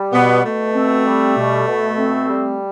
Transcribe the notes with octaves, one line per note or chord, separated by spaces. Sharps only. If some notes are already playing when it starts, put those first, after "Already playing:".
Already playing: G3
B2 B3
B2 A3
C4
G3
B2
B2
C4
G3